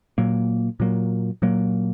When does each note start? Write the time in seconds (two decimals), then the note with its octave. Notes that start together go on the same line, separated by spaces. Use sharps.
0.18 A#2 F#3 A#3
0.80 A#2 F#3 A#3
1.42 A#2 F#3 A#3